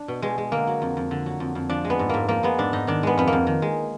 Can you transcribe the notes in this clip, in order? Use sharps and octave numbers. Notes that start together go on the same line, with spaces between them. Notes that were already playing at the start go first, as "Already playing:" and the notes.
Already playing: D4
B2
B2 G#3
G#3
D3 A#3
F#3
F2
F2
D3
F#3
F2
F2
F3 D4
G#3
B3
G#2
G#2 A#3
F3 A#3
G#3 B3
G#2 D4
G#2 D#4
D#3 D4
G#3 B3
F2 B3
A#3
F2
D#3
G#3